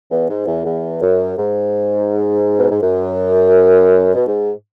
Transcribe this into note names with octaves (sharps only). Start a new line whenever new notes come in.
E2
G#2
E2
E2
F#2
G#2
B2
G#2
F#2
B2
G#2